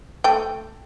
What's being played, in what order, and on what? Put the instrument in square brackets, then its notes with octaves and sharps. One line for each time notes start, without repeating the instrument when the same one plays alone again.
[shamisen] A3 G5